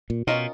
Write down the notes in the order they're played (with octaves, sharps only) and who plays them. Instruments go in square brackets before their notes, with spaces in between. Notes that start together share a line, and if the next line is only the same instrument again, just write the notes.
[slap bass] A#2
[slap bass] B2 [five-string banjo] C#4 F4 A#4 D#5